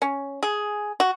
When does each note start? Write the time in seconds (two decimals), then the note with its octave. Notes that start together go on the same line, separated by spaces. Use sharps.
0.02 C#4
0.43 G#4
1.00 F#4